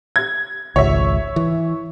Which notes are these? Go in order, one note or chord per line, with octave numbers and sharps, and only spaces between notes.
G#6
G#1 C#2 C#5 E5
E3